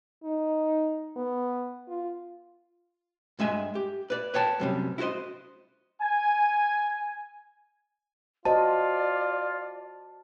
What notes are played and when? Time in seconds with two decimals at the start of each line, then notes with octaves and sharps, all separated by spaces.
0.24 D#4
1.16 B3
1.88 F4
3.39 G2 G#3 E5 G#5
3.75 G4
4.10 B4 D5
4.34 B4 C#5 G5 A5
4.60 F#2 C3 G3
4.98 E4 F#4 G4 C5 D#5
6.02 G#5
8.45 F4 F#4 C5 D5 D#5 A5